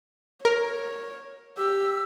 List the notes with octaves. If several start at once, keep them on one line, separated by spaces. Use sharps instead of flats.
A#4 C#5
G4 E6